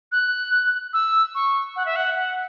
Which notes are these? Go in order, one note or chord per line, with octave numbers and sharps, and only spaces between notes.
F#6
E6
C#6
F#5
E5
F#5
F#5